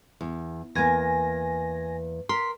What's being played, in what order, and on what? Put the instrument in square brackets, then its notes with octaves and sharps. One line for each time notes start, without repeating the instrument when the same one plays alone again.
[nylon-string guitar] E2
[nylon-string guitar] E2 A#3 [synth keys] G#5 A#6
[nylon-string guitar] A#4 [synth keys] C6 B6